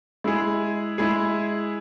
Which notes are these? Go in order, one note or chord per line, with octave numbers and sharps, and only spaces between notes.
G#3 E4 G#4
G#3 E4 G#4